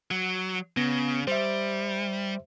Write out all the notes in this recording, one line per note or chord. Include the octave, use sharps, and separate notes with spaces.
F#3
C#3 B3 A#6
G3 C5 E5